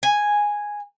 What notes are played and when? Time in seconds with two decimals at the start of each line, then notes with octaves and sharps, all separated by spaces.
0.03 G#5